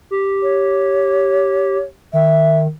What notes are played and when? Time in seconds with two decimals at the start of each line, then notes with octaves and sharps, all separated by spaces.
0.11 G4
0.42 C#5
2.13 D#3 E5